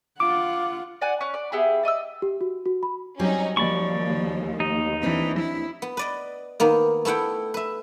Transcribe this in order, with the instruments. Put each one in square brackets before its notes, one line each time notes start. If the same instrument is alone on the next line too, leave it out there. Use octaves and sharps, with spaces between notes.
[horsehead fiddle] F4 F#5 [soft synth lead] D6
[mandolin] D5 F#5 G#5
C#4 F#6
D5
B3 E4 G4 G#4
D5 D#5 C#6 E6
[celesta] G4
F#4
F#4
B5
[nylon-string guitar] F#3 G3 C4 [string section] C#4 D#4
[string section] D#2 [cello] F3 [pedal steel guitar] D5 B5 C#6
[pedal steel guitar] D#4
[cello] E3 [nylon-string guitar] C4 D4
[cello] E4
[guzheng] B3
B4 D5 D#5
D#3 A#3 B3
A3 B3 E4 F#5 G5
B4 E5